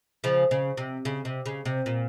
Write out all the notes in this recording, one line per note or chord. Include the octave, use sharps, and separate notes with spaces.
C#3 F3
C#3
C3
C#3
C3
C#3
C3
A#2